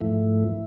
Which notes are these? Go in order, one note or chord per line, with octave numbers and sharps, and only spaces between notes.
G#2 F3 A3 E4